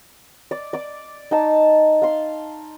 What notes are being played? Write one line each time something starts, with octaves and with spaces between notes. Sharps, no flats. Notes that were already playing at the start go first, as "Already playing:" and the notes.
D5
D5 D6
D#4 A5
F5 C6